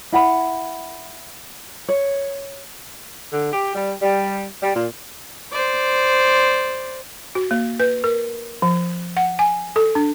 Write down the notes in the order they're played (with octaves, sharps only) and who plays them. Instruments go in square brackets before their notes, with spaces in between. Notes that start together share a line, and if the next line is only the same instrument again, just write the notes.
[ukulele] E4 F#5 B5
C#5
[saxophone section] D3
G4
G3
G3
G3
A#2
[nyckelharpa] C5 D5
[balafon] F#4
A#3
B4
A#4
F3
F#5
G#5
A4
D4